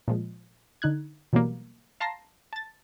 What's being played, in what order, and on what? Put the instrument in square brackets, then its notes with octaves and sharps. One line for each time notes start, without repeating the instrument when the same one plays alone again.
[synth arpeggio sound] A#2 F3 G#3
D3 D#4 F#6 G#6
B2 E3 F#3 G3 A#3
F5 A5 A#5 C6 A#6 C7
A5 A6